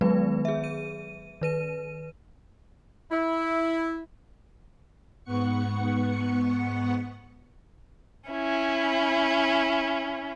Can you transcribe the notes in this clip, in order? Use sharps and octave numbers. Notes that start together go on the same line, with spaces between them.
D#3 F#3 G#3 B3 B4
G#4 E5
D#7
D#3 B4 D#7
E4
G#2 B3 F#5 C#6 C#7
C#4 E4